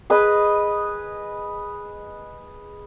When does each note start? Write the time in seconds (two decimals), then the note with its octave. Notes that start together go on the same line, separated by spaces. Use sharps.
0.10 G#4 B4 D#5